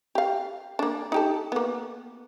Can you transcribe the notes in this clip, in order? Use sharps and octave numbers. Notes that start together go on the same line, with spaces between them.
G4 F5
A#3 D4
D#4 G4 A4
A#3 B3